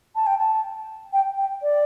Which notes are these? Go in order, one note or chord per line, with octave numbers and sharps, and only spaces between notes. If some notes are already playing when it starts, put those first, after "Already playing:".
A5
G5
A5
G5
G5
D5